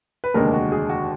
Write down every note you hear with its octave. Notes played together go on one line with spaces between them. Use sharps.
B4
F1 D#2 D3 G#3 D4 A#4
F#4
G#4
F#4